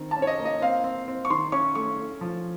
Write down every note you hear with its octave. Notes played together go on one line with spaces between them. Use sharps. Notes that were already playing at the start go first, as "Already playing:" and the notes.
Already playing: D#3 C4
A5
C#4
C#5
D#5
A#3
D#5
C4 F5
C4
C4
C#6
D#3 C6
C#4 C#6
A3 C#6
A3
F3